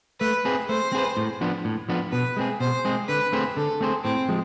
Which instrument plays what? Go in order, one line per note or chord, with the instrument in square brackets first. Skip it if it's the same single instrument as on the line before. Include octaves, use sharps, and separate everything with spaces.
[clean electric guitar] A3 [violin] B4
[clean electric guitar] C4 G#4 B4
[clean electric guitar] A3 [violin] C5
[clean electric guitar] C4 G#4 B4
A2
F3 B3 D4
A2
F3 B3 D4
[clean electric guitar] B2 [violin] B4
[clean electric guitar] G#3 C4 G#4
[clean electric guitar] B2 [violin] C5
[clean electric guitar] G#3 C4 G#4
[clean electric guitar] D3 [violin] B4
[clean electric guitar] A3 C4 G#4 C5
[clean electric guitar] D3 [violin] A4
[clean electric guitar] A3 C4 G#4 C5
[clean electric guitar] A2 [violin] C4
[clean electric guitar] F3 G#3